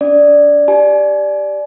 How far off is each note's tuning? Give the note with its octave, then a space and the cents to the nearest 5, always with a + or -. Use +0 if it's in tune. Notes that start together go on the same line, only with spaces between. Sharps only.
D4 -45 D5 +0
G4 +0 D5 +0 G#5 +35